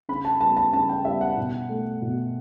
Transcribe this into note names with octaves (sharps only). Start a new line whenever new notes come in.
C#3 B5
A5
G3 B3 A5
A5
C#3 A5
G5
G3 B3 E5
F#5
B2
A3
B2